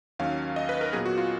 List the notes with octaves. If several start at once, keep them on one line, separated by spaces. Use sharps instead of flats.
D#2 D#3 F#3 C#4 F5
D#5
B4
A#4
A#2 F#3 B3 G#4
F#4
F4